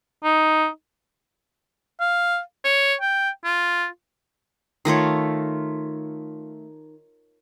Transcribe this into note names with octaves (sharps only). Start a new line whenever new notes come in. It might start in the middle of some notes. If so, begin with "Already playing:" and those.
D#4
F5
C#5
G5
F4
D#3 A3 F4 C#5